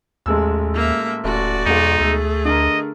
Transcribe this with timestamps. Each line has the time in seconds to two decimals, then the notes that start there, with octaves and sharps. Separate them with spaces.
0.26 A1 D#2 G#3 E6
0.74 A#3 E5
1.24 D#1 A1 F#4 D5
1.66 B1 E2 G#3 D#4
2.00 D2 A3 G#4
2.45 D3 A#4 D#5